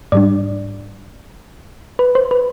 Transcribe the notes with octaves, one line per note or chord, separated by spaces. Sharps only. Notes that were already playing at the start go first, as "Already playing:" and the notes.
G#2 G3 D4 D5
B4
C5
B4